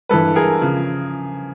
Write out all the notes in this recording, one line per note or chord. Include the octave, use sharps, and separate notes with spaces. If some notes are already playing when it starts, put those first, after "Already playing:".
G2 E3 A4 B4
G#4 A#4
C#3 F3